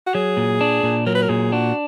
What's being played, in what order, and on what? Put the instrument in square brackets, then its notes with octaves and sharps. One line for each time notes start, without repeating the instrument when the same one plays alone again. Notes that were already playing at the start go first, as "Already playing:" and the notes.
[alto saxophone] F#4
[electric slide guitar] F#3 [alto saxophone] G#4
[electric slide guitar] A#2
D4
A#2
[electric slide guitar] F#3 [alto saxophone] A#4
[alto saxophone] B4
A#4
[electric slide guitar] A#2 [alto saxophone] G#4
[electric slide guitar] D4 [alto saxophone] F#4